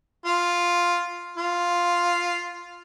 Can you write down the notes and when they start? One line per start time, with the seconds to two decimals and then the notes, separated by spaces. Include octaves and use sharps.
0.26 F4
1.38 F4